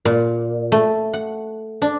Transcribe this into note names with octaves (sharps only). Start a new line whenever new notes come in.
A#2
A3
F#5
D4